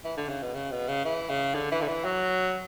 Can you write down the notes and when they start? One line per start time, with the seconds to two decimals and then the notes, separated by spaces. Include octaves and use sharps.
0.04 E3
0.17 D3
0.29 C#3
0.42 B2
0.54 C#3
0.71 B2
0.88 C#3
1.05 E3
1.29 C#3
1.55 D3
1.71 E3
1.81 D3
1.88 E3
2.05 F#3